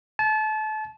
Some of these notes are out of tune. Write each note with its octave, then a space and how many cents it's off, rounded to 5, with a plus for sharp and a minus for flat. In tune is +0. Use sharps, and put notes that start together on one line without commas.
A5 -30